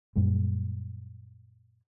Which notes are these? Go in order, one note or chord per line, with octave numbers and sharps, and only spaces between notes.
F#2 A#2 G3 G#3